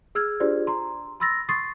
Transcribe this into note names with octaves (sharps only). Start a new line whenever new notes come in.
G#4 E6 F6 G#6
D4 F4 G4 G#4 C5 D5
A#5 C6
B5 C6 E6 A6 A#6
C6 C#6 D#6 A6 C7